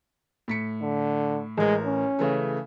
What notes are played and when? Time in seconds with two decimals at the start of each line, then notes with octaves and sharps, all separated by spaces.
0.48 A2 B6 C#7
0.82 D3
1.58 A1 G#3 A#4
1.86 C#4
2.19 C#3 E3 A3